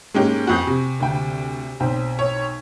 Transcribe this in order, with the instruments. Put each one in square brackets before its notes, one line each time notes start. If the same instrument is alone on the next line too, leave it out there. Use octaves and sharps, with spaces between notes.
[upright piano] G#2 A#3 [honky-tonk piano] G#3 C#4 G4
[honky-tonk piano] F2 F#4 [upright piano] G#5 C#6 G6
[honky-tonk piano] C3
[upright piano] D2 G5
B1 C4 G5
[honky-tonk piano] C#5